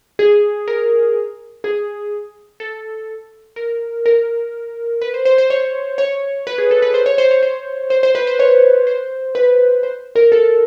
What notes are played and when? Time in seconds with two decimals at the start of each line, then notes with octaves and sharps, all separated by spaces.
0.19 G#4
0.68 A#4
1.64 G#4
2.60 A4
3.56 A#4
4.06 A#4
5.02 B4
5.14 C5
5.25 C5
5.38 C5
5.50 C#5
5.98 C#5
6.47 B4
6.58 G#4
6.71 A4
6.82 B4
6.94 C5
7.06 C#5
7.18 C5
7.31 C#5
7.43 C5
7.90 C5
8.03 C5
8.15 B4
8.27 C5
8.39 C#5
8.87 C5
9.35 B4
9.83 C5
10.16 A#4
10.32 A4